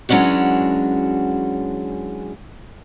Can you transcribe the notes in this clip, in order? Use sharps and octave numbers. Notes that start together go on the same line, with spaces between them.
E3 F#3 G#3 C#4 D4 F#4